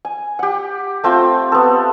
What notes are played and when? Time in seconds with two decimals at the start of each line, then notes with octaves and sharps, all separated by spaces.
0.05 G#5
0.39 G4 F#5
1.04 A3 C4 F4 G5
1.52 B3 A4